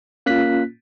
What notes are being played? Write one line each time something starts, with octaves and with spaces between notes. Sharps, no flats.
A#3 C#4 F4 F#6 B6